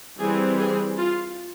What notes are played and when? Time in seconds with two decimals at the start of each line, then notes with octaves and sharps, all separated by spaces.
0.18 E3 G3 C4 G#4
0.58 G#4
0.98 F4